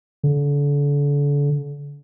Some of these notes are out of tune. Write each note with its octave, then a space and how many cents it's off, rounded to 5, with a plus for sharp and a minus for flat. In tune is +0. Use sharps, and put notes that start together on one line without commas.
D3 -35